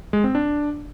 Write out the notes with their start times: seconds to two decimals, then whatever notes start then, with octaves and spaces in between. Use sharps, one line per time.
0.13 G#3
0.24 C4
0.35 D4